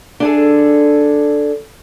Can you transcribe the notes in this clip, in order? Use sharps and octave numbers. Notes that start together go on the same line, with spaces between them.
D4 G#4 A4